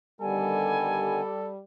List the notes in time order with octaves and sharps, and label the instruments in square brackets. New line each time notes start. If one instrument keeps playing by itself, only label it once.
[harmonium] D3 D#3 B3 [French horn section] G3 [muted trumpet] A4 [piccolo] G#5